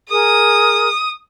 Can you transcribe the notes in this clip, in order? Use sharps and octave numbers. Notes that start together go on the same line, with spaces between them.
G#4 A#4 D#6